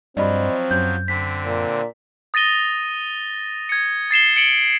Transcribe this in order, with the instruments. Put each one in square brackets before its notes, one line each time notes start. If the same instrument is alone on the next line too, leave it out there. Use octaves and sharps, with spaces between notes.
[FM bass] G2 [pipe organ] F3 F#3 [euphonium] C4 [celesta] D5 D#5 B5
[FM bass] F#2 [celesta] G6
[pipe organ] D3 C4 [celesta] B6
[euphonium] A#2
[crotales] D#6 A6 A#6 D#7 G7
G#6 C#7
A6 C7 E7 G7
C#7 D7 F#7 G7